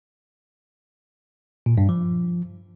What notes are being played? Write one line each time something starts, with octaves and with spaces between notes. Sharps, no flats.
A#2
G2
F3